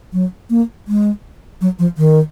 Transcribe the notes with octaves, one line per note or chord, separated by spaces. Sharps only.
F#3
A#3
G#3
F#3
F3
D#3